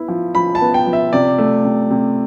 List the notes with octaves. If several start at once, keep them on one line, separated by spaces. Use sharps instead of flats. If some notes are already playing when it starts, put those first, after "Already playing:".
Already playing: B3 E4
F3
F3 B5
A5
B3
G5
F3
E5
C3 D5
A3
C3
C3